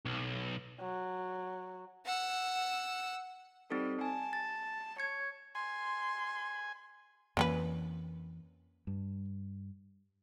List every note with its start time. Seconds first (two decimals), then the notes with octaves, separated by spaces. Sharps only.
0.06 B1
0.80 F#3
2.05 F#5 E6
3.70 G3 C4 D#4 A4
4.01 G#5 A5
4.33 A6
4.98 C#5 G#6 C#7
5.55 G#5 C6
7.37 F2 E3 A#3 C#4 B4
8.87 G2